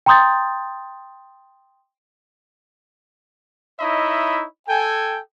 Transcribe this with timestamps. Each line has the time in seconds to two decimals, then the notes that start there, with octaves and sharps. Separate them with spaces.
0.06 G5 A#5 C6 D#6 G6 A6
3.80 D#4 E4 C#5 D#5 E5 B5
4.68 A4 G5 G#5